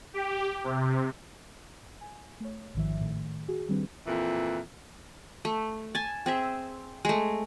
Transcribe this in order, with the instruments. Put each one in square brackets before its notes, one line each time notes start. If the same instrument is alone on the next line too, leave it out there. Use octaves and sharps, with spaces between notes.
[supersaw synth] G4
C3
[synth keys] G#5
A3 C#5
A1 G#2 D#3 F3 E5
A2 D#3 A3
F#4 G#4
D#3 G3 C4 D4 B4
[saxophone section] F2 A#2 E3
[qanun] A3
G#5 A5
C4 G#4 E5
G#3 A3